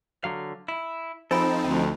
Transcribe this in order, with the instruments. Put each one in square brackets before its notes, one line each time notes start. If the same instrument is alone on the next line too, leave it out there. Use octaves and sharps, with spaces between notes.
[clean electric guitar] D3 F#3 F5
E4
[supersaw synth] F3 C4 D#4 [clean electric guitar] A4 [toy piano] C5 G#5 B5
[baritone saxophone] D2 [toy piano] A5